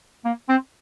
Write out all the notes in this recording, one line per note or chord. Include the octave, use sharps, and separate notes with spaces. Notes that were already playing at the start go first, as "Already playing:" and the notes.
A#3
C4